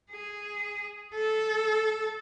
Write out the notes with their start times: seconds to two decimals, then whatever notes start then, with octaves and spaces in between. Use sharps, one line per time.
0.11 G#4
1.15 A4